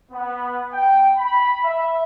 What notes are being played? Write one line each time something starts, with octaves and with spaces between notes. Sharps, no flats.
B3
G5
B5
E5